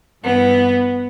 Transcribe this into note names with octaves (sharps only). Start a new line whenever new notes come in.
G2 E3 B3